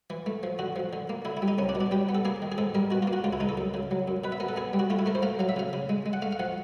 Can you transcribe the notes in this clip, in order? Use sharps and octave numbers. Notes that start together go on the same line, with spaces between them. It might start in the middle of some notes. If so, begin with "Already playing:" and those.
E3
A3
F3
D3 F#4
F3
D3
A#3
D3 E4
E4
G3
D#4
C2 C#4
D4
B2
D4
G3 G4
B3
A4
A#3 G#4
D#3
G#4
G#2 A4
G3 A#4
B2 F#4
F4
A#3
F#4
C#2 F4
E4
C#2 D#4
A4
F#2
C#3
F#3
F#2
B2 B4
E5
B3 A#4
A4
B3 G#4
G3
F#4
A3 F4
E4
A3 A#4
C5
A3 F5
F#3 F5
E5
C#3 F5
C#3
G#3
G#3
F#5
A3 F5
F5
F3 F#5